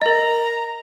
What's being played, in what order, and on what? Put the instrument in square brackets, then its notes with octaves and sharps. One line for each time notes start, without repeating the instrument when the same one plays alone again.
[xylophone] A#4 D#5 [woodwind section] A#5